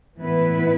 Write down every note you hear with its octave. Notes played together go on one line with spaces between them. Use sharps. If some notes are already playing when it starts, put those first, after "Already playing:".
A2 E3 B3 E4 B4